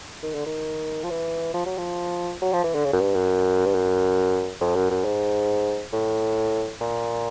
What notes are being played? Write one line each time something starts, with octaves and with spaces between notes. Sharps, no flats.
D#3
D3
D#3
F3
E3
F3
F#3
F3
F#3
F3
E3
D3
C#3
F#2
G2
F#2
G2
F#2
F2
F#2
F#2
G#2
A2
A#2